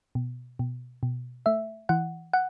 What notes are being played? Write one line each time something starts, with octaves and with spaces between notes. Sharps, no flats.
B2
B2
B2
A3 E5
E3 F#5
F#5